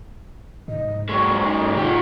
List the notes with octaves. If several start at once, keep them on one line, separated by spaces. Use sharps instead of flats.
G#2 D#5
F#3 G#3 C#6
D#4
G#2 D#4 F4 G4